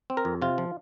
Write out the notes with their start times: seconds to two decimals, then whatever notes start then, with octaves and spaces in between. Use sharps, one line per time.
0.10 C4
0.17 A#4
0.25 F2
0.42 C3 F4
0.58 F3